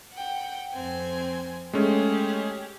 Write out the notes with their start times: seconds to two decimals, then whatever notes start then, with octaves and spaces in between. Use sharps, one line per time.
0.11 F#5 G5
0.72 F2 C4 G#5
1.73 G#3 A3 C#4 G4 G#4